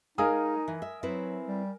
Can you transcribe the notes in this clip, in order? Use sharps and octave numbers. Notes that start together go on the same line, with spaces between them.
G#3 D#4 G#4 A#4 F5 G#5 D#6
E3
E5
F#3 C4 E4 B4
G3